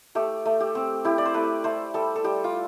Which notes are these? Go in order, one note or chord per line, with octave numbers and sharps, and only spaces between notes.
A3 G4
A3
G4
C4
E4 G4
D5
C5
A3 B4
A3 C5
G3 A4
A4
G3 G4
F4